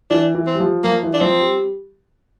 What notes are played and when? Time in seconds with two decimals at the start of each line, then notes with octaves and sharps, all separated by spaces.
0.11 E3 D4
0.35 E3
0.47 C4
0.54 G3
0.60 F3
0.84 F3 A#3
1.03 E3
1.14 D4
1.21 F3 C4
1.40 G3